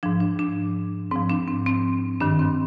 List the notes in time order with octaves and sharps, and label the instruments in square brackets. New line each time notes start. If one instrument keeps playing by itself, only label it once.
[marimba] G#2 F3 D4
D4
D4
G#2 F3 C4
D4
C4
C4
G2 D#3 D4
C4